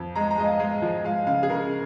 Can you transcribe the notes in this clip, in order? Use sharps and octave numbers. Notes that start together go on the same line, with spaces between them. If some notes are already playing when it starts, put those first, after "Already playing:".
Already playing: F2
G#3 A#5
A#5
G#3 D#5
F5
G#3
F3
G#3 F5
C#3 F5
G#4
C#3 A#4